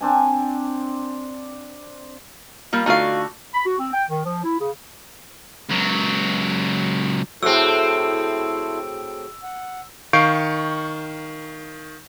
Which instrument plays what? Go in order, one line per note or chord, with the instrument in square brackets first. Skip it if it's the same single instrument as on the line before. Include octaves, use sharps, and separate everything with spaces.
[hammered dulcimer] C4 D4 G#5
[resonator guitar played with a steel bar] G3 A#3 F4
[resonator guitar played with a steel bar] D3 A3 F4 [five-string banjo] D#4 F5 [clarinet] F#4
[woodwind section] B5
F#4
C4
G5
D#3
F3
E4
C#3
[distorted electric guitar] C#2 F#3
[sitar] A2 C4 [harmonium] E4 A4 C5 [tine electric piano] F#4 G#4 [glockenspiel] E6
[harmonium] F#5
[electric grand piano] D#3 F5 C#6 G6 C7 D7